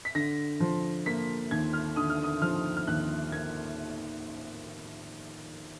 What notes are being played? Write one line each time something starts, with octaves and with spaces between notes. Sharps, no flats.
B6
D3 A#6
F3
A#3 B6
D#2 G#6
F6
D3 D#6
F6
D#6
F3 F6
F6
D#2 F#6
A#3 G#6